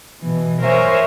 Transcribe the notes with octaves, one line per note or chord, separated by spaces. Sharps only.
B2 E3
A#4 C5 C#5 E5 G#5